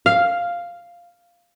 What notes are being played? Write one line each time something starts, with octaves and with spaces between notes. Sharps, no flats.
F5